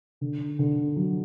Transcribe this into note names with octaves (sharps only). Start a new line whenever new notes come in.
D3
D3
F#3